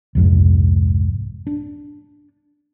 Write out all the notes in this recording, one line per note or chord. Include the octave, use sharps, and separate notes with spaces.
C2 F2 G#2
D4